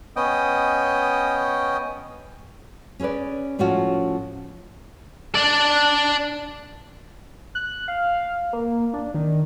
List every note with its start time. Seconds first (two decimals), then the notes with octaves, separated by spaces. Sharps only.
0.16 B3 C#4 D#5 G5 D#6
3.00 C#4 G#4 A#4 B4 D5
3.59 A2 F3 C#4 F4 F#4
5.35 D4 D5
7.55 F#6
7.88 F5
8.53 A#3
8.93 D4
9.14 D#3